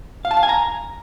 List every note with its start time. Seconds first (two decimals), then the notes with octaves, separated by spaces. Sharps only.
0.25 F5
0.31 A5
0.37 F5
0.43 G#5
0.49 A#5